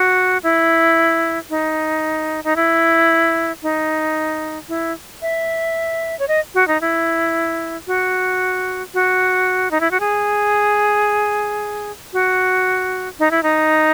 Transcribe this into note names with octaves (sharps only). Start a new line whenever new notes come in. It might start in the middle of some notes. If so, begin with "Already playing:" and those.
Already playing: F#4
E4
D#4
D#4
E4
D#4
E4
E5
C#5
D#5
F#4
D#4
E4
F#4
F#4
D#4
E4
F#4
G#4
F#4
D#4
E4
D#4